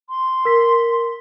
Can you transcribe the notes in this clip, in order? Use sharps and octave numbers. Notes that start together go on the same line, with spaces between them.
C6
A#4 B6